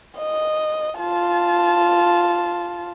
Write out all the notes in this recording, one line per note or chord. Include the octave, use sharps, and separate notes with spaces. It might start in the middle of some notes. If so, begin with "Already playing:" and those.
D#5
F4 A5